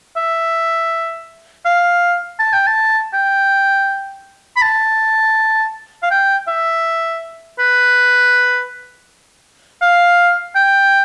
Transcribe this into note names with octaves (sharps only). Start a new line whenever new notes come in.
E5
F5
A5
G5
A5
G5
B5
A5
F5
G5
E5
B4
F5
G5